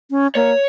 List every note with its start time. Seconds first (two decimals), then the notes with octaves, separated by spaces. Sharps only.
0.11 C#4
0.35 A#3 C#5